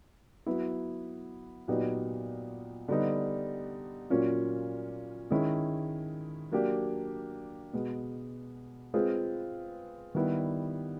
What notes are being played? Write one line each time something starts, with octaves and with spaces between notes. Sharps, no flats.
F#3 B3 E4
A#2 F#3 B3 D#4 G4
D3 G3 B3 D#4
A#2 F#3 A#3 C#4 F4
D#3 G#3 C#4 E4
F#3 A#3 D4 G4
B2 G#3 B3
G#3 C4 F4 G#4 B4
D#3 G3 B3 E4